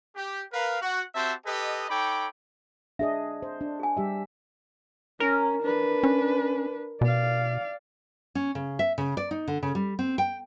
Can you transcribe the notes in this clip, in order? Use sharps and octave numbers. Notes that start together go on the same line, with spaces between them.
G4
A#4 B4 F5
F#4 F#5
C4 F#4 G4 C5 E5 A5
G4 A4 B4 D#5
D#4 A4 C#5 G5 B5 D6
D4 G#4 D#5 E5
C5
D4
G#4 G#5
G3 G4 E5
C#4 A#4
D4 B4
C#4
B2 D5 F5
C#4
C#3
E5
C#3
D5
D#4
D3
C#3
G3
C4
G5